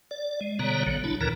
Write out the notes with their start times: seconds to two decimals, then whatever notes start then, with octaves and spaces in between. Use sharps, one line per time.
0.11 D5
0.41 G#3
0.59 B2 D3 G3 B3 C#5 A#5
0.86 A#1 D3 F#3
1.04 D4 E4
1.21 D2 A#2 D3 E3 A#4 A#5